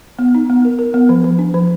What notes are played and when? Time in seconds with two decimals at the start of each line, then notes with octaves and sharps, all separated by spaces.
0.19 B3
0.35 D#4
0.50 B3
0.65 A#4
0.79 A#4
0.94 B3
1.09 F3
1.24 F3
1.39 D4
1.54 F3